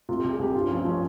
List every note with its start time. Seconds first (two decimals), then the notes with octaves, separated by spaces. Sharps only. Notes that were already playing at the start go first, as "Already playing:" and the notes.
0.09 C3 F4
0.19 C2 G4
0.32 G#4
0.39 C2 G4
0.55 G2 F4
0.67 F3 C#4
0.77 C4
0.85 F3 C#4